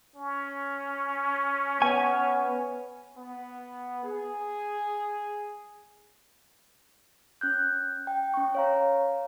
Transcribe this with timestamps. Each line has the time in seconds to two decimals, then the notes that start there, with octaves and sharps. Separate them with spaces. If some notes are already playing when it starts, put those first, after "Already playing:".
0.16 C#4
1.82 B3 C#5 G#5
3.18 B3
4.04 G#4
7.41 C#4 F#6 G6
8.07 G5
8.34 C#4 C#6
8.55 C#5 F5 A#5